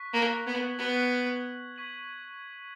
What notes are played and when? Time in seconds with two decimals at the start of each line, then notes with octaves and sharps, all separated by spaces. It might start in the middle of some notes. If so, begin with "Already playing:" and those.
Already playing: C#6 F#6 B6
0.14 A#3
0.47 B3 G#6 B6 F#7
0.79 B3
1.76 C#6 G#6 B6 D#7 F#7